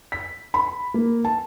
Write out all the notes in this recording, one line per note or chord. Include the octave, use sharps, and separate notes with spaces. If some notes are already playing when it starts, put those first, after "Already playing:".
B6
B5
A#3
A5